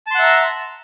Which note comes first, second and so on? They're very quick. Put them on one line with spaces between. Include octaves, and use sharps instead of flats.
A5 C6 F#5 E5 A#5